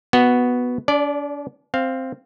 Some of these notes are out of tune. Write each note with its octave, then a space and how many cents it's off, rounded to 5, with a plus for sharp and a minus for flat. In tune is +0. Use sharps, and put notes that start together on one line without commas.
B3 +0 F#4 +0
D4 -40 D5 +0
C4 +0 F5 +0